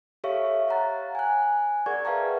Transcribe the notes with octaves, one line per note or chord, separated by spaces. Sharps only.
G4 A4 C#5 E5 F5 C#6
C#5 F5 F#5 A#5 F#6 A6
G#5 F#6
G#4 A#4 D5 F#5 C#6 G#6
B4 E5 F5 G5 A5 A#5